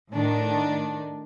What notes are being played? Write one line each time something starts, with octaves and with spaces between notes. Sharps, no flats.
A2 D#3 D4